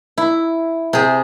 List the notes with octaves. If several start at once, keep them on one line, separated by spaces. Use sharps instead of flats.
E4
C3 G#4